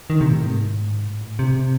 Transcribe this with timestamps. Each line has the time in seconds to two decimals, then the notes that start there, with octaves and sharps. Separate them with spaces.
0.10 D#3
0.21 C3
0.31 A2
0.43 G#2
1.07 A2
1.39 C3